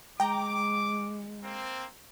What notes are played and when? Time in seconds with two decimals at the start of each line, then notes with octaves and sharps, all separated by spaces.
0.20 G#3 G5 A#5 D6
1.44 A#3 C4